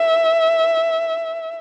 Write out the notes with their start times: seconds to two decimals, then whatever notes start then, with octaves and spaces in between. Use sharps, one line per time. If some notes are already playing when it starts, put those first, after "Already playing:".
Already playing: E5